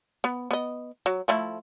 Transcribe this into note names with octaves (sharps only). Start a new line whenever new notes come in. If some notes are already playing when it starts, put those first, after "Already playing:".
B3
B3 D#5
F#3
F3 A3 E4